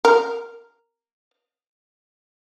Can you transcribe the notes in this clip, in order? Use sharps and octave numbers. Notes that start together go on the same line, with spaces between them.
A#4